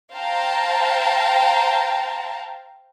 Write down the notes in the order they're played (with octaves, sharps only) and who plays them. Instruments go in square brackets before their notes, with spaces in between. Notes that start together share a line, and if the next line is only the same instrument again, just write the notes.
[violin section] C5 F5 G5 A5 A#5